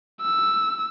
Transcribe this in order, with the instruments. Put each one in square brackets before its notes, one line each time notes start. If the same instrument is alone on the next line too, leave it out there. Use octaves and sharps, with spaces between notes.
[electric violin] E6